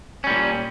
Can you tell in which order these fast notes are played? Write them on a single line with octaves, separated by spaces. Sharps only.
C#4 G3 A#2